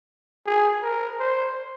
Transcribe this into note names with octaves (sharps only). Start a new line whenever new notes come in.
G#4
A#4
C5